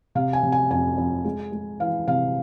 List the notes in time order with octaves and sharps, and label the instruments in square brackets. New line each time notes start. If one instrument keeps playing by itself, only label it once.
[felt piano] C3 F5
G#5
C3
G#5
F2 G#5
F2
G#3
G#3
E3 F5
C3 F5